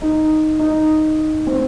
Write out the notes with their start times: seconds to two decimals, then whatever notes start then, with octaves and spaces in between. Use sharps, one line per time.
0.02 D#4
0.59 D#4
1.47 C4